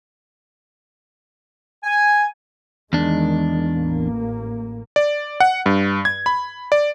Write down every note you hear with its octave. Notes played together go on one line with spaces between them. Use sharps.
G#5
E2 D#3 G#3 D4
A1 A#3
D5
F#5
G2
G#6
B5
D5